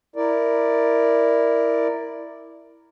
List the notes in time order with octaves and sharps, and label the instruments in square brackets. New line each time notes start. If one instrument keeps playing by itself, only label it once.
[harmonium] E4 A#4 D5